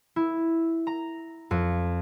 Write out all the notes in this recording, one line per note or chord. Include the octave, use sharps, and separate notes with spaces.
E4
A#5
F2